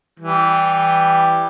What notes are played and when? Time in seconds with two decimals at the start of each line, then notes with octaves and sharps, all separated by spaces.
0.20 E3 G3